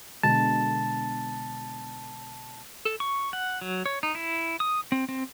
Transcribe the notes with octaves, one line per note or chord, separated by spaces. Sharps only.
B2 D3 G#3 A5
A4
C#6
F#5
F#3
C#5
D#4
E4
D#6
C4
C4